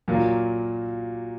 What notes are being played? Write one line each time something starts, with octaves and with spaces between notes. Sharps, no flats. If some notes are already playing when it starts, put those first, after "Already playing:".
A#2 F#3 A#3